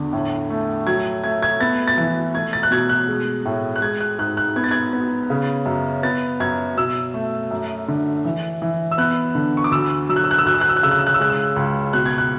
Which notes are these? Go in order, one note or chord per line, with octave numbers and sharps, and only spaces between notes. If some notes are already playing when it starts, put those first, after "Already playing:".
Already playing: E2 D3
A2
A3
F#3 G#6
A3 G#6
G#6
B3 A6
A6
E3
A3 G#6
A6
F#6
B2 G#6
F#6
G#3
A2
F#6
G#3 G#6
F#6
G#2 F#6
F#6
B3 G#6
A6
G#6
B3
C#3
F#2
B3 A6
F#2 G#6
B2 E6
A3
F#2
D3
E3
E3
E6
B3 F#6
D3
C#6
D6
D2 E6
F#3 E6
F#6
E6
F#6
E6
D2 F#6
E6
F#6
E6
F#6
C#3 E6
F#6
E6
F#6
E6
G#3 F#6
E6
C#2
B2 F#6
G#6
F#6